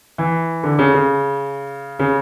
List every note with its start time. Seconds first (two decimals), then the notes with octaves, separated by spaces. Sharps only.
0.18 E3
0.63 D3
0.79 C#3
0.94 C#3
1.99 C#3